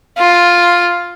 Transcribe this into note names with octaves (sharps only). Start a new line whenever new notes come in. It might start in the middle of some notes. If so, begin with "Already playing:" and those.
F4